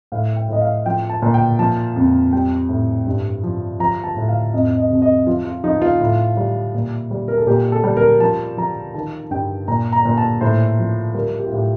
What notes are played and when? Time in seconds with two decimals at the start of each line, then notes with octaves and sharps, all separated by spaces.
0.12 A2 F5
0.36 G5
0.49 A2 D#5
0.61 F5
0.86 F3 G5
1.10 A5
1.22 A#2
1.34 G5
1.59 F3 A5
1.96 F2
2.32 G3 G5
2.69 A2
3.07 G2
3.43 F3
3.80 F3 A#5
4.04 A5
4.17 A2
4.29 F5
4.53 F2 D#5
4.78 D#5
4.90 C3
5.02 D#5
5.26 F3 F4
5.45 F4
5.64 F3 D#4
5.82 F4
6.00 A2
6.37 G3
6.74 A#2
7.11 G3
7.28 A#4
7.38 A4
7.47 A#2 G4
7.72 A4
7.84 G3
7.97 A#4
8.20 F3 A5
8.57 F3 A#5
8.94 D#3 A5
9.31 G2 G5
9.68 A#2 A#5
9.92 A#5
10.05 A#2
10.17 A5
10.41 A2 C5
10.79 F3
11.14 G3 A#4
11.39 G4
11.46 F4
11.52 A2 G4